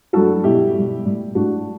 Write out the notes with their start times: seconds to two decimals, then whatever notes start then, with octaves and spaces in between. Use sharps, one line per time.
0.13 G2 F#3 A3 F#4 A4
0.44 B2 G3 E4 G4
0.75 B2 G3
1.05 A2 G3
1.35 A2 G3 D4 F#4